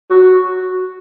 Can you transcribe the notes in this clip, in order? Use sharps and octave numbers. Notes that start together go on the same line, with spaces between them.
F#4